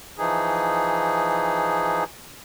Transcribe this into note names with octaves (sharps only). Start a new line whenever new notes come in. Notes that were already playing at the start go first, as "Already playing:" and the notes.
E3 F3 D#4 G#4